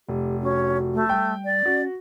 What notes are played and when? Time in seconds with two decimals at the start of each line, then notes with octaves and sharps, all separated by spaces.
0.09 F1 G4
0.42 C#4 F#4
0.94 A3
1.09 G3 G5
1.45 D5
1.66 C#4 F#4